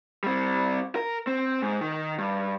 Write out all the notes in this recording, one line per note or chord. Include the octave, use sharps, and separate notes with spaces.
G3 C4
A#4
C4
G#2
D#3
G2